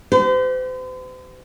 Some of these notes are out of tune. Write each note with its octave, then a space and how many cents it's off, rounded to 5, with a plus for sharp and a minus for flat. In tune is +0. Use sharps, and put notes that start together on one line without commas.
G4 -30 C5 -45